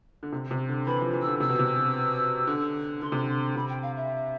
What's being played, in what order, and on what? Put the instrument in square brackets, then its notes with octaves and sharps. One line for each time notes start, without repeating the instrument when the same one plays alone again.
[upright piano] D3
C3
C3
D3
[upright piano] E3 [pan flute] B5
[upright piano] F3
E3
[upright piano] D3 [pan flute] E6
[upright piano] C3 [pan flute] E6
[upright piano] B2
C3
D3
[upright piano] D3 [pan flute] C6
[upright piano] C3
D3
[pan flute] C6
[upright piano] C3 [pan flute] B5
[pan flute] G5
F5
E5